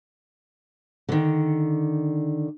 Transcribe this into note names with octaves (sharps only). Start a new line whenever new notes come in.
D3 D#3